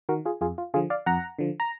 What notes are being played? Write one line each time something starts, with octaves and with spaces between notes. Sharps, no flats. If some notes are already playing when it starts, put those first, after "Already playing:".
D#3 F#4 A#4
F4 G#4
F2 F4 G#4
F4
D3 F3 F4 G#4
D5 F5
F2 F#5 A#5
D3 F3
A#5